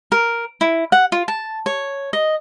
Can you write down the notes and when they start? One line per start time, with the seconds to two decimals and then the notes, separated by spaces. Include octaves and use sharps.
0.12 A#4
0.61 E4
0.92 F#5
1.12 F4
1.28 A5
1.66 C#5
2.13 D#5